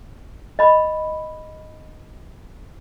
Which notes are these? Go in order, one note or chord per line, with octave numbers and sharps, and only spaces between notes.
D#5 B5